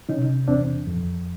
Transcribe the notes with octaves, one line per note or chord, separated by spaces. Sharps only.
C3 C#4 D#4
E2 C4 D4
F2